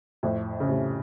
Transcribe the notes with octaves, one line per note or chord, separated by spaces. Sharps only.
F2 A2
C#3
A2 C3